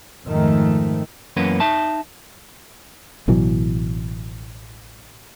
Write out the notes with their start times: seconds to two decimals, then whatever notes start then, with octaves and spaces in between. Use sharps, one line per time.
0.25 F2 G#2 D#3 A3
1.37 F#2 E3 A#3 B3 C#4
1.60 D#4 E5 A5
3.28 A1 B2 E3 F#3